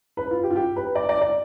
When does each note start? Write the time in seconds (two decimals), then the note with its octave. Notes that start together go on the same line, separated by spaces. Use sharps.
0.17 B4
0.31 F4
0.43 G4
0.51 F4
0.56 G4
0.76 B4
0.95 D5
1.09 D5
1.21 D5